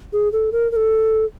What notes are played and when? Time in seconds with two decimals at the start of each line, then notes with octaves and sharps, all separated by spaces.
0.13 G#4
0.32 A4
0.52 A#4
0.72 A#4
0.76 A4